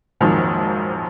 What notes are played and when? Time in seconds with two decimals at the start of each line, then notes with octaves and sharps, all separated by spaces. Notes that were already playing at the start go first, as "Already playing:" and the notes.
0.20 A#1 F2 G#2 D#3 F3 F#3